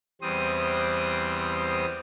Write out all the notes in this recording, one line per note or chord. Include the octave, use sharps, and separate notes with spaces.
E2 G3 C4 C5 D#6